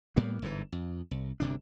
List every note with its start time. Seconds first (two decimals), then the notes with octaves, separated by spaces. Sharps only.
0.16 A2 G3 A#3 B3
0.42 G1 G#2 D3 E3
0.72 F2
1.11 C2
1.40 G1 D2 C3 D4